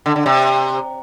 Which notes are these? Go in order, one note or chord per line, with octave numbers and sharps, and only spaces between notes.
D3
D3
C3